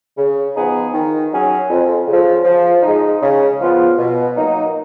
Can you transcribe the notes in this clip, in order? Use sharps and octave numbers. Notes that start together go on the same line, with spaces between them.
C#3
F3 B3 D#4 G#4
D#3
F#3 C#4 G#4
F2
C#3 F3
F3
G#3 D#4
C#3
F3 B3 F4
B2
F#3 A#3 D#4